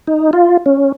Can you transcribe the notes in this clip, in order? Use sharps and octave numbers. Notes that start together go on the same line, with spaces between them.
D#4
F4
C#4